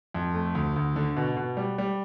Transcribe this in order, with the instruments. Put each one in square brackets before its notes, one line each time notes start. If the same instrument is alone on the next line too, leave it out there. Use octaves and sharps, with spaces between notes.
[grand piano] F2
A3
D2
D2
D3
B2
B2
G3
G3